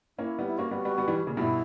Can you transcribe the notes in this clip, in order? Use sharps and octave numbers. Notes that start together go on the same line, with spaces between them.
A#3 C#4 E4
G3 B3
E4
A#3 C#4 F#4
G3 B3
G3 B3
G3 B3
E3 G3
A#2 C#3
G2 B2 E4